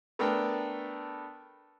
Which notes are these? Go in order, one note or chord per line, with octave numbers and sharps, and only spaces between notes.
A3 B3 D4 A#4 G5 A5